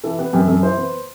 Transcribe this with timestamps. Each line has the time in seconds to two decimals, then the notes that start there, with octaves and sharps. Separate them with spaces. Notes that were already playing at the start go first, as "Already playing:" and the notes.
0.04 E3 A4
0.18 B3 G4
0.33 F#2 G4
0.48 F#2 A4
0.63 E3 C5
0.77 B3